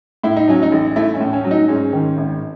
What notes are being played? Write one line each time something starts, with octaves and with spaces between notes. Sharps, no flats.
A2 E4
D#4
F#3 C#4
D#4
A1
A3 E4
C#4
A2
C#4
F#3
D#4
G#2 C#4
D#3
G#1